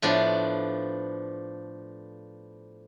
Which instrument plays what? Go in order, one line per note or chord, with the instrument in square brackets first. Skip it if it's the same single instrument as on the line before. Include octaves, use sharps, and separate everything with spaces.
[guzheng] A2 F3 B3 D4